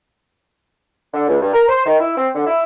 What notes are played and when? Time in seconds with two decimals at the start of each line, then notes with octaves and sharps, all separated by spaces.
1.13 D3
1.28 C#2
1.40 G2
1.53 A#4
1.69 C5
1.86 D#3
1.99 E4
2.16 C4
2.35 D3
2.47 E4